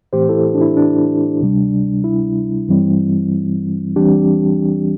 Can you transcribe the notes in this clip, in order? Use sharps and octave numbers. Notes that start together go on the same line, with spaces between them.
A2 E3 A3 C4 G4 C5
E4 A4
D4
E4
D4
D2 C3 G3
E4
G2 E3 G3 C4
E2 E3 G3 C4 D4 G4